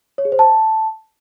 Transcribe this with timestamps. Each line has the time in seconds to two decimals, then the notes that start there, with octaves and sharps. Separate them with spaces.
0.18 C#5
0.25 G#4
0.32 C5
0.39 A5